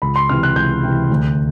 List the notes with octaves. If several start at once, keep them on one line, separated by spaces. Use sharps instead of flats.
C#2 B5
C6
C3 E3 F6
F#6
C#2 G6
C3 E3
D2